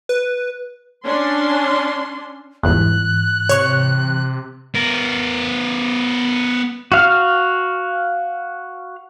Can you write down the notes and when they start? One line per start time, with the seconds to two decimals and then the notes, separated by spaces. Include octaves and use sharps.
0.09 B4
1.04 C#4 D4 C6
2.63 G1 E2 G#2 E3 F#6
3.49 C3 C#5 C#6
4.75 B3 A#4
6.92 F#4 F5 F6